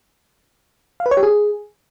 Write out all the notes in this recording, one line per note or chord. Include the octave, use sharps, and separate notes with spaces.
F5
B4
C#5
G4
G#4